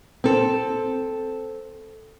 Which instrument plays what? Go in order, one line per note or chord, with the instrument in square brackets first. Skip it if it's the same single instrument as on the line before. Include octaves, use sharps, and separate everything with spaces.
[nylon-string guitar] C4 A4